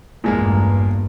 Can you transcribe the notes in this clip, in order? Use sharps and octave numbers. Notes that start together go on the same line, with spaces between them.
A1 E2 G2 A#2 G#3 A#3